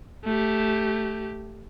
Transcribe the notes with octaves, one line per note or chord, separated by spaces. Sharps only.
A3 G4